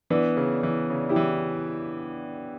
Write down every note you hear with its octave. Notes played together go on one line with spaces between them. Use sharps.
E3 B3 D4
C#3
E3
C#3
E4 G4
E3